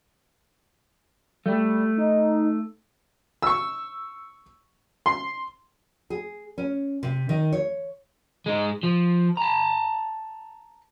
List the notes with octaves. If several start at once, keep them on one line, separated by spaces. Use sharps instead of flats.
G3 A3
D#4
C#6 E6
C6
G#4
C#4
C3
D#3
C#5
G#3 D#4
F3
A5 A#5